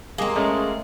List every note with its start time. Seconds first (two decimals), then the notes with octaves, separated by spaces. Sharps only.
0.18 G#3 A#3 C4 G#4 A5
0.36 G#3 A3 C#4